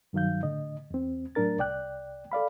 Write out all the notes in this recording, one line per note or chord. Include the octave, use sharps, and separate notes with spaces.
G2 D#3 F#3 F5 G6
A2 D3 D#5
E2 C4
A2 F#3 D4 A#4 A6
C2 D5 G5 F#6
A4 D5 F5 B5